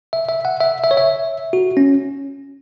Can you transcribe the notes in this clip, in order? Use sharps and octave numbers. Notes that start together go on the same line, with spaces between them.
E5
E5
F#5
E5
E5
C#5
E5
F#4
C#4